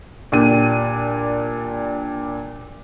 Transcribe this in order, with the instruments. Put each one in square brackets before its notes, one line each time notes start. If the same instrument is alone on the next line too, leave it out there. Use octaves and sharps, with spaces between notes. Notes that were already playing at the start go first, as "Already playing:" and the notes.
[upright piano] A#2 D4 G4 D#7